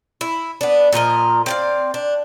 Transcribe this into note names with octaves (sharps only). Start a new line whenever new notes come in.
E4
B3 D4
A#2 F3 A#4 D#5
C4 D5 F5
D4